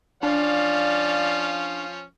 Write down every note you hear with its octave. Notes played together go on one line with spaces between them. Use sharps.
F3 C#4 D4 D5 F5